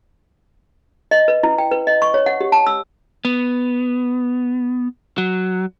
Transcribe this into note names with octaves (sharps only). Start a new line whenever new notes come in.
D#5
B4
E4
G5
B4
D#5
C#6
C#5
F#5
G4
A5
E6
B3
F#3